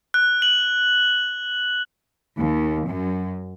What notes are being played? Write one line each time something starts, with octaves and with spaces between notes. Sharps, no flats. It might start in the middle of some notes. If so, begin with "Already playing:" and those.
F#6
F#7
D#2
F#2